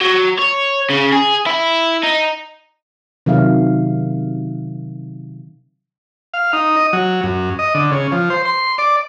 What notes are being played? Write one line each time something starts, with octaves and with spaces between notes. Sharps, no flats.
F#3
C#5
C#3
G#4
E4
D#4
C3 D#3 F#3 E5 F5
F5
D#4
D#5
F#3
F#2
D#5
D3
C#3
F3
C5
C6
D5